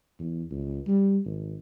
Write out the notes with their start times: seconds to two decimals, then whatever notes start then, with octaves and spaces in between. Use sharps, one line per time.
0.19 E2
0.51 C#2
0.87 G3
1.25 G#1